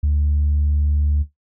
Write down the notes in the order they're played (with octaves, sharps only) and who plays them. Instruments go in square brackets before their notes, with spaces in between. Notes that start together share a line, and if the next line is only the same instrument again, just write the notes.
[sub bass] D2